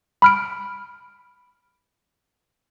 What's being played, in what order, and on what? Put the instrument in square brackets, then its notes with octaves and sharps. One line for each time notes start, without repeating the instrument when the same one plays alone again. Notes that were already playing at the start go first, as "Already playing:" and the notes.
[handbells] B5 F6 D7